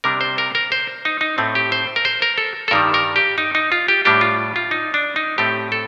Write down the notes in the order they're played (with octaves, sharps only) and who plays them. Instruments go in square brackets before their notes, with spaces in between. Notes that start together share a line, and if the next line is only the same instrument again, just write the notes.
[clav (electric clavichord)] C3 G3 D4 A#4
C5
A#4
A#4
C5
D#4
D#4
A2 A3 C4
G4
C5
A#4
C5
A#4
A4
A4
G2 D#3 G3 A#4
A#4
G4
D#4
D#4
F4
G4
A2 G3 D4 G4
F4
F4
D#4
D4
D#4
A2 A3 C4 G4
A4